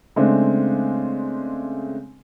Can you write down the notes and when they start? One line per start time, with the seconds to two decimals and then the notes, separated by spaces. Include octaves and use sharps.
0.16 C#3 G#3 A3 C4 D4